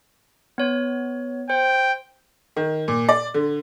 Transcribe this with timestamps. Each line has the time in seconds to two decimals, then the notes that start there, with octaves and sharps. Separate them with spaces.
0.58 B3 C#5
1.50 C5 G5
2.56 D#3
2.88 A#2
3.09 D5
3.34 D3